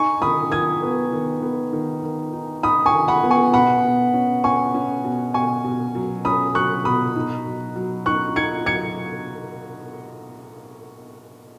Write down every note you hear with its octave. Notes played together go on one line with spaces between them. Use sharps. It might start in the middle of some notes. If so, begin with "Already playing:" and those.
Already playing: D#4 G#5 C#6
D#3 B5 D#6
D#3 D#6 G#6
B3
D#3
B3
D#3
D#3
D#4
D#4 B5 D#6
G#5 C#6
D#3
F#5 B5
B3
G#5 C#6
B2 F#5 B5
B2
C#4
C#4 G#5 C#6
C#4
B2
B2 G#5 C#6
B2
F#3
C#4 B5 D#6
F#3 C#6 F#6
B2 B5 D#6
D#4
F#3
F#3
D#4 C#6 F#6
D#4 G#6 C#7
F#3 G#6 C#7